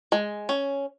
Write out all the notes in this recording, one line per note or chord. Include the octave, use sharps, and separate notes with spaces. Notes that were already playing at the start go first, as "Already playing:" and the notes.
G#3
C#4